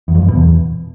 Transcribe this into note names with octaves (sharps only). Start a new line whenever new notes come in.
E2
F2
F#2
B2
E2